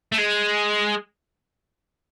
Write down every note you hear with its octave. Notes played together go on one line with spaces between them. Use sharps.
A3
G#3